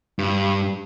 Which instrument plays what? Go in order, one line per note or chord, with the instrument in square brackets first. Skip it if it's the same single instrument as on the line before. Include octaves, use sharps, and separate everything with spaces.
[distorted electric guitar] G2